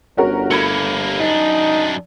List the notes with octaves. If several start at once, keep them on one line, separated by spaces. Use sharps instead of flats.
G1 C#4 F#4 A#4
A3 A#3 B5 G#6 C#7
F#2 D4 D#4